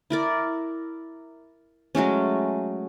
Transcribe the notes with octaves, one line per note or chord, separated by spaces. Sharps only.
E4 A#4 D5
F#3 G#3 A3 C#4